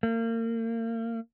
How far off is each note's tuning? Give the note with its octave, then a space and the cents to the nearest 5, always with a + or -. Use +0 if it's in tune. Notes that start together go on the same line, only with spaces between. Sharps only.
A#3 -35